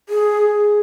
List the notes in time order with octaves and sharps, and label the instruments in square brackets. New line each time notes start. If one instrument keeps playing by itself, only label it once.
[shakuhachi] G#4